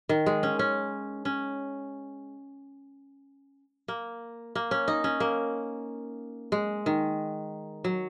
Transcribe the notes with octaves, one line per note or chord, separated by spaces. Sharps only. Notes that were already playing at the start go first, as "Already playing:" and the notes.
D#3
G#3
C#4
C#4
C#4
A#3
A#3
C#4
D#4
C#4
A#3
G#3
D#3
F#3